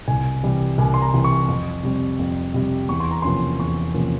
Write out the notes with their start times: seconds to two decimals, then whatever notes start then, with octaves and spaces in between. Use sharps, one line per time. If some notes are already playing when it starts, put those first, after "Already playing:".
0.08 C2 G#5
0.43 C3 E3 G3
0.78 C2 G#5
0.94 C6
1.02 A#5
1.13 C3 E3 G3
1.24 C#6
1.48 F2
1.83 C3 G3 C4
2.19 F2
2.54 C3 G3 C4
2.89 E2 C#6
3.00 C6
3.11 A#5
3.22 C3 F3 A#3 C#4 C6
3.59 E2 C#6
3.94 C3 F3 A#3 C#4